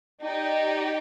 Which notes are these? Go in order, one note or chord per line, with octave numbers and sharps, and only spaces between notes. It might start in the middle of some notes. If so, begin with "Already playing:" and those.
D#4 G4 D5